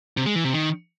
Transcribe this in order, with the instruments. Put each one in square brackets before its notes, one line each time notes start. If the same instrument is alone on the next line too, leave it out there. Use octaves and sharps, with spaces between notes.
[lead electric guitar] C3
G#3
E3
C3
D#3